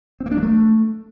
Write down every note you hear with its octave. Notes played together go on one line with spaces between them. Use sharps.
C4
A#3
D4
F#3
A3